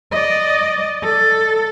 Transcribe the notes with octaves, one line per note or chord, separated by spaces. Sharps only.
D5 D#5
A4